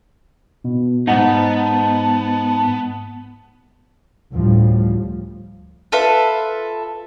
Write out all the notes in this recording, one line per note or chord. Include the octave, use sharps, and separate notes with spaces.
B2
G#2 B3 D#4 F#5 A5
D2 A2 F3 G3
F4 A4 B4 E5